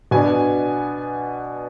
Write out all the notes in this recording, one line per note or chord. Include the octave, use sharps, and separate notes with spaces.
B2 B3 D4 G#5